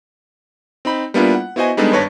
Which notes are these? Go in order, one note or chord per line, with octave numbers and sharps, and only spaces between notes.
C4 D#4 B5
G3 A#3 B3 D4 E4 F4
F#5
B3 E4 F#4 C5 D#5 G#5
G3 G#3 B3 D4 D#4 A4
G#1 G2 B4 C#5 A5 A#6